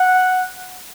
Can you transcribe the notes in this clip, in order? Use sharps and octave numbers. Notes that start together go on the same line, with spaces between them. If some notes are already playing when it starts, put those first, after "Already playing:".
Already playing: F#5